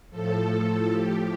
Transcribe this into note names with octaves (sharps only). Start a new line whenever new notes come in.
A2 F3 A4
A2 F3 G4